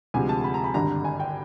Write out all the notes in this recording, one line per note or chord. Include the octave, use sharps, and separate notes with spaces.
D2 C3 F3 G#3 G#5
A5
B5
A#5
B5
G#1 G2 D3 G3 A#5
G#5
G5